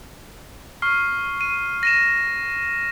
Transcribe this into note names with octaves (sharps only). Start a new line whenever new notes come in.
C#6 F6 C7
D#7
A#6 D#7 E7